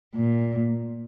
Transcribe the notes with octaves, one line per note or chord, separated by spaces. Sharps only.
A#2